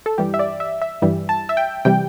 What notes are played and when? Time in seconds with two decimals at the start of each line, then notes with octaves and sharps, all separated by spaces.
0.06 A4
0.18 G2 E3 G3 G4
0.34 E5
0.39 D5
0.60 E5
0.82 E5
1.02 G2 E3 G3
1.29 A5
1.49 E5
1.57 G5
1.85 C3 E3 G3 G5